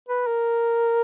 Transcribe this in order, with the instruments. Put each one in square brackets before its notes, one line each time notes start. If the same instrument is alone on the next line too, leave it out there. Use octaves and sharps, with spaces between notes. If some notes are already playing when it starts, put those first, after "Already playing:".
[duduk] B4
A#4